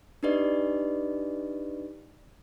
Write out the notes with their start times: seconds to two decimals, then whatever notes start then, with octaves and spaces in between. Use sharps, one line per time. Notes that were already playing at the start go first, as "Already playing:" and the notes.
0.23 D4 D#4 G4 B4 D5 D#5